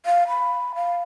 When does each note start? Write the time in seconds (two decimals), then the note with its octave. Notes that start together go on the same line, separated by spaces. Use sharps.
0.06 F5
0.28 B5
0.75 F5